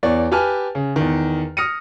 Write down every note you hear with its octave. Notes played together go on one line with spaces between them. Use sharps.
E2 C#5 D5
G4 B4 G#5 A5 F6
C#3
E2 D#3
D#6 F6 A#6 C#7 D#7